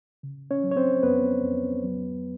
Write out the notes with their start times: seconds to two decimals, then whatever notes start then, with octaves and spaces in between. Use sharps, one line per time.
0.23 C#3
0.51 C#4 C#5
0.63 F#3
0.71 C#5
0.76 C4 C5
1.03 F2 B3 B4
1.43 F2
1.84 F#3